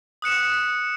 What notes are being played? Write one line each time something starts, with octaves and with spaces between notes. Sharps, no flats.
D#6 F#6 C#7 E7